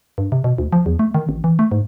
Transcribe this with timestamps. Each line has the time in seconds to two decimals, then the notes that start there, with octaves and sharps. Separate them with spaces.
0.18 G2
0.32 C3
0.44 B2
0.58 D2
0.73 F3
0.86 E2
0.99 A3
1.15 D#3
1.29 A1
1.44 E3
1.59 A3
1.72 G#2